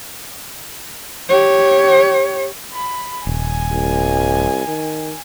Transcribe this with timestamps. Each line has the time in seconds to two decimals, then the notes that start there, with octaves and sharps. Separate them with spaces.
1.29 G4 C#5
2.73 B5
3.27 D#1 G#5
3.72 C2
4.68 D#3